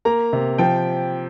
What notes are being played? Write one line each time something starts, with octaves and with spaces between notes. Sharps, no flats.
A#3 A#5
C3
F3 G5